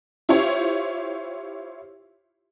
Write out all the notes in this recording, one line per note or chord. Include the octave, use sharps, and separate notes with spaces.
E4 F4 G4 C5 C#5